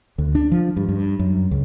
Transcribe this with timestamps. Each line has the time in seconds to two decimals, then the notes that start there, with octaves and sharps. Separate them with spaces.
0.18 D2
0.35 D4
0.51 F3
0.77 G2
0.89 G2
1.19 F#2
1.51 C#2